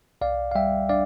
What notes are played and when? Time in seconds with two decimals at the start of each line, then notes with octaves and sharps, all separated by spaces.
0.21 C2 D5 F5
0.51 F5
0.55 G3 E5 G5
0.89 D4 D5 F5